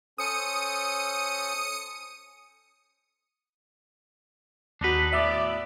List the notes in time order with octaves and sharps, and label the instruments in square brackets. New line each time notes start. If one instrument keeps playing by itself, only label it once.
[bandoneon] C#4 A4 C5 [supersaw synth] D#6 C#7 D#7
[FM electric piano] D#2 F#4 [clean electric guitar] D4 D#4 B4
[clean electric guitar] A2 B3 [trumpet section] D5 [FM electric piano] E5 E6